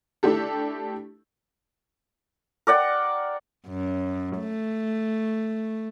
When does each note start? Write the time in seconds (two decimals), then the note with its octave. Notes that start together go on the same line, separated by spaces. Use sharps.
0.23 A3 D4 E4 G4 A4
2.67 A#4 D5 F#5 G5
3.67 F#2
4.39 A3